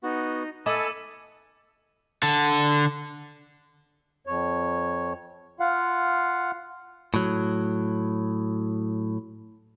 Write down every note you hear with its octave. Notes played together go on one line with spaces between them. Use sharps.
B3 D#4 F#4
A4 D#5 G#5 A5 B5 D6 E6 D#7
D3 A4
F2 C#5
F4 F5 F#5
A2 F#3